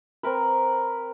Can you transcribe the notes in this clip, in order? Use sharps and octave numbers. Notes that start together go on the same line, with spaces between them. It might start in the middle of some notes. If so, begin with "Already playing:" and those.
C4 A#4 B4